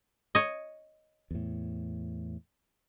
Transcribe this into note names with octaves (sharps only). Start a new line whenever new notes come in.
C#5 D#5
E2 A2